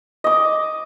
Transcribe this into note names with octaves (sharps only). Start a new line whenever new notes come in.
D#5 D6